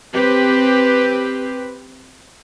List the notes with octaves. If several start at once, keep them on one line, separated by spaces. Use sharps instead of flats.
C4 G4 B4